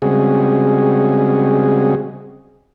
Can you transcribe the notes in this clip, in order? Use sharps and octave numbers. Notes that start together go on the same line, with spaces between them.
C#3 G3 G#3 C4 F#4 G#4